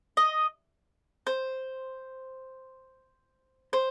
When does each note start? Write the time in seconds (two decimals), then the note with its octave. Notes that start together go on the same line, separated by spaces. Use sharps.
0.17 D#5
1.27 C5
3.73 C5